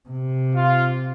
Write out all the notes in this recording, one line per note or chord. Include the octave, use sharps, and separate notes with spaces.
C3
F4